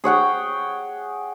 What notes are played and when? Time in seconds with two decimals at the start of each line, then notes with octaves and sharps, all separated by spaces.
0.04 G#4 C#5 F#5 G5